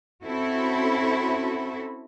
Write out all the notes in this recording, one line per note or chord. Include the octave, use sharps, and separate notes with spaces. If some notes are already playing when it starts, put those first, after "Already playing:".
C4 C#4 E4 F#4 A4